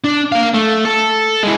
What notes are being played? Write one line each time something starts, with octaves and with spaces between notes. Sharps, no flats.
D4
A#3 F5
A3
A4
E3 G#3